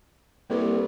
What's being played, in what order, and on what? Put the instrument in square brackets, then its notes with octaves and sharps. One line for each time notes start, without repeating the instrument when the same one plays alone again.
[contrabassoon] C2 [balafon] A#3 A4 B4